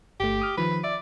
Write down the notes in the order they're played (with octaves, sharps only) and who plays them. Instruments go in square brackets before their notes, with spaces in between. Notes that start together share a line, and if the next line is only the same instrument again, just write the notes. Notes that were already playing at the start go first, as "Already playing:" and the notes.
[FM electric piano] G1 A3 [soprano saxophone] G4
[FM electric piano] D#6 F6
[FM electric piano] D#3 F3 [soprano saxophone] B4
[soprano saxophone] D5 [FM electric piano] E5